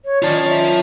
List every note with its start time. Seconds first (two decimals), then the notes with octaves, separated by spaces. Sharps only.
0.05 C#5
0.22 D#3 C#4 F4 D5 A5
0.49 E5